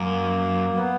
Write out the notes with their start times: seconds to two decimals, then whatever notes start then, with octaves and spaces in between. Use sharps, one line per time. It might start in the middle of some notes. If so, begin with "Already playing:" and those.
Already playing: F#2 A#3
0.76 B3